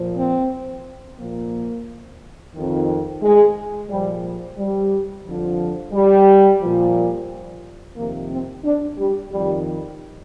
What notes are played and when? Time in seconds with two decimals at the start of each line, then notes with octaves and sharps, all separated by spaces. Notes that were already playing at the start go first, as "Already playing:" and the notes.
Already playing: A#2 F3
0.18 C4
1.19 A#2 F3 A#3
2.55 F2 D#3
3.22 G#3
3.90 A#2 F3 G3
4.58 G3
5.25 F2 D3 F3
5.93 G3
6.61 A#2 F3
7.96 F2 C3 D#3 A#3
8.30 C4
8.64 D4
8.98 G3
9.32 F2 D#3 G3